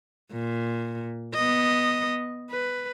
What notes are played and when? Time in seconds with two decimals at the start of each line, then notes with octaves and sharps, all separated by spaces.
0.32 A#2
1.34 B3 D#5
2.51 B4